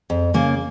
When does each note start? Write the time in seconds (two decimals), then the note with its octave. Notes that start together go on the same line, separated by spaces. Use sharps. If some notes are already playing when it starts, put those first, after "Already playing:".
0.10 F2
0.34 C#3 A#3